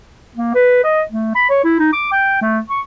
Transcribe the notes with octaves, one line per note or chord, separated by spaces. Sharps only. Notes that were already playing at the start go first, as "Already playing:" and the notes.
A#3
B4
D#5
A3
B5
C#5
E4
D#4
D6
G5
A3
C#6